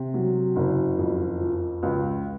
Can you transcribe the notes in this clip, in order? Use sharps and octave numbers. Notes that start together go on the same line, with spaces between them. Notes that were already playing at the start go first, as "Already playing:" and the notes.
Already playing: C3
F#3
F#1
F2
F3
C#2